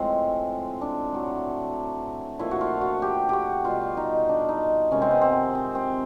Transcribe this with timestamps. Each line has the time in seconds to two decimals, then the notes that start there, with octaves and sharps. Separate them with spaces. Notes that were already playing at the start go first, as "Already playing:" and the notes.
Already playing: A2 F3 G#3 C4
0.81 D4
1.12 A2 F#3 A3
2.39 A#2 F3 A3 E4
2.51 F#4
2.61 F4
2.81 F#4
3.02 G4
3.29 F#4 G4
3.65 B2 G3 F4
3.97 D#4
4.29 D4
4.49 D#4
4.91 C3 D#3 G#3 C#4
5.02 C4
5.11 B3
5.21 C4
5.55 C4
5.75 C4